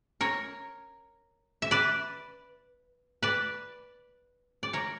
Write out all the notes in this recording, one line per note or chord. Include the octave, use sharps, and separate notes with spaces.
A#4 C#5
E5
B4 D5
B4 D5
D5
A#4 C#5